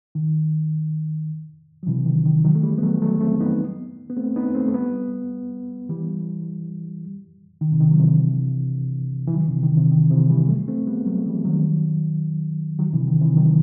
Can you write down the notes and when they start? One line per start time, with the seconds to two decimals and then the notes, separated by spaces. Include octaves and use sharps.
0.15 D#3
1.83 F#3
1.87 C3 E3
2.06 D#3
2.26 D#3
2.45 D#3 F#3
2.55 A3
2.63 E3 G3
2.78 B3
2.83 F#3 A3
3.02 F#3 A3
3.21 A3 C4
3.40 B3 D#4
4.10 B3
4.16 A3 C4
4.36 B3 D#4
4.55 A3 C4
4.68 A3
4.74 G3 B3
5.89 E3 G3
7.61 D#3
7.72 C3
7.80 D#3
7.91 F#3
8.00 C3 E3
9.27 E3
9.34 D#3 F#3
9.48 C3 E3
9.63 D#3
9.77 C3
9.92 D#3
10.11 C3 E3
10.30 E3 G3
10.48 F#3 A3
10.68 A3 C4
10.87 G3 B3
11.06 F#3 A3
11.26 E3 G3
11.45 D#3 F#3
12.78 D#3 F#3
12.93 C3 E3
13.08 D#3
13.21 C3 E3
13.36 D#3 F#3